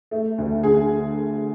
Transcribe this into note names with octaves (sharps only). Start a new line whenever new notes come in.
A3
D2
D3 G#4